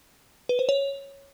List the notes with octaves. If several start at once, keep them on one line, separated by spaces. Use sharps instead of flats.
B4
C5
C#5